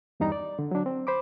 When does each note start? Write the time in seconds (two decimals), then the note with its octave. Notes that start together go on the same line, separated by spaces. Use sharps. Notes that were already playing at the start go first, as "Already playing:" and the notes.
0.20 E2 G2 G3 D#4 A#5
0.32 D5
0.59 D3
0.71 F#3 D4
0.86 C4
1.07 C5 B5 D6